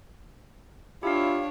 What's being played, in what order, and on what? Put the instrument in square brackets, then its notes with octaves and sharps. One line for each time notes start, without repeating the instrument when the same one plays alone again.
[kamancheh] D4 C#5 [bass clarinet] E4 [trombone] F4 [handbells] G4 F5